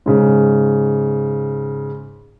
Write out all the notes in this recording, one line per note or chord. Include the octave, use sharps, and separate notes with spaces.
G#2 C#3